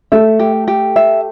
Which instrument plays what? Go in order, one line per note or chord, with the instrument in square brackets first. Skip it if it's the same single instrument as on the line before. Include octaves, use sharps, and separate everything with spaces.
[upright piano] A3 [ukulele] E5
[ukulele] G4
G4
E5